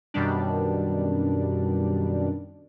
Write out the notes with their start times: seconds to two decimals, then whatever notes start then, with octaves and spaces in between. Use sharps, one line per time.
0.14 F#2 B2 D#3 G3 D4